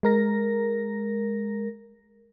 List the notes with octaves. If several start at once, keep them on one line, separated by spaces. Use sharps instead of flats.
G#3 A#4 A#6